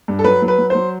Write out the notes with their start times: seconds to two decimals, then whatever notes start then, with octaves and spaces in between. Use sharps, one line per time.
0.08 G2
0.19 A4
0.24 F#3 B4
0.42 F#3
0.48 B4
0.59 F#3
0.70 F#3 C5